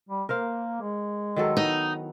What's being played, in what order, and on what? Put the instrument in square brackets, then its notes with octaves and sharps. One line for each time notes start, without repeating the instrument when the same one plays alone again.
[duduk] G3
[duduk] A#3 [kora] A#4 C5 F5
[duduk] G#3
[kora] D#3 F#3 A4
[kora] B3 [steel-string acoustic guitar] D#4